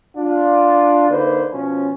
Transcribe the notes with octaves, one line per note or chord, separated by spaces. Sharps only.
D4 F4
D3 A#3 D#4 B4 C5
B2 F3 C#4